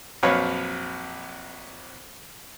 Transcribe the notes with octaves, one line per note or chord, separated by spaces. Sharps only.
A#1 F2 F#3 B4 C#5 F5